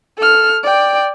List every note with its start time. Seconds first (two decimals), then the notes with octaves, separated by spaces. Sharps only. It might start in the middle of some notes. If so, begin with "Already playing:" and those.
0.18 A4 F6
0.63 D5 G5